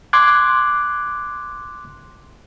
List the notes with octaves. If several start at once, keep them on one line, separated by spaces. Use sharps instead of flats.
C6 D6 F#6 G#6